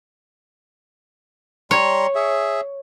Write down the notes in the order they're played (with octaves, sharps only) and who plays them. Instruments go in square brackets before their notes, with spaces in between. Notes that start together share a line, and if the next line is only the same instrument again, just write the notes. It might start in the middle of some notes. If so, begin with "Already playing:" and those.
[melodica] G3 A#5 C6 [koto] C#5
[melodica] G#4 E5